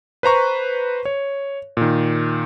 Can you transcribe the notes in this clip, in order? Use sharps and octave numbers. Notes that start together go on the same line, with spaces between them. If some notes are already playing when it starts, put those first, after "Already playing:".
B4 C5 A#5 C#6
C#5
A#2 D#3